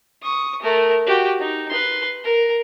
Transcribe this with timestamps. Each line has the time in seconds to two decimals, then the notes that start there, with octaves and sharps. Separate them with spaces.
0.23 C#6 D#6
0.62 A3 A#4
1.07 F#4 G4
1.40 D#4
1.70 B4 C6
2.24 A#4